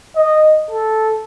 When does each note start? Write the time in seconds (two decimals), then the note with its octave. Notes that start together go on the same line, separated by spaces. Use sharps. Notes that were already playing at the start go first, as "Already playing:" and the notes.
0.17 D#5
0.71 A4